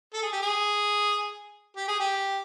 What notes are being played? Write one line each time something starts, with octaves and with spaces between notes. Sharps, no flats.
A4
G#4
G4
G#4
G4
G#4
G4